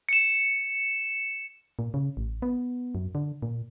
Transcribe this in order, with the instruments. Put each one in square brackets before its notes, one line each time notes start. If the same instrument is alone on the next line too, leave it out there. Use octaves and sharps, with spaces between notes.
[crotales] C#7 E7
[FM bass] A#2
C#3
A1
B3
F#2
D3
A#2